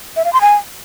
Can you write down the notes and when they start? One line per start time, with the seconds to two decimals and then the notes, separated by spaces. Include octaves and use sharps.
0.16 E5
0.25 F5
0.33 C6
0.41 G#5